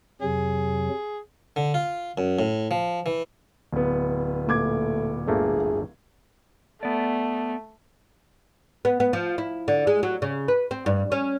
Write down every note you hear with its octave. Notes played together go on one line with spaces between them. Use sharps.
F2 C3 F#3 G#4
D3
F4
F#2
A2
F3
E3
D1 B3
A#2 A3 D6 G#6
G1 A3 A#3 G#4
A3 B3 D5
B3
B3
F3
E4
D3
G#3
F#3
C#3
B4
C4
G2
C#4